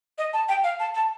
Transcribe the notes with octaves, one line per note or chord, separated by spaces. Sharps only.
D#5
A5
G5
F5
A5
A5